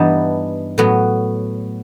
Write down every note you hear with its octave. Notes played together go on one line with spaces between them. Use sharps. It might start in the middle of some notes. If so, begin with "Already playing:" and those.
Already playing: G2 E3 B3 D#4 A5
A2 F#3 B3